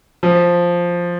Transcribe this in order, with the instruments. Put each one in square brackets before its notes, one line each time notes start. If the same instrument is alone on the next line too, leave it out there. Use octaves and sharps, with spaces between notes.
[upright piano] F3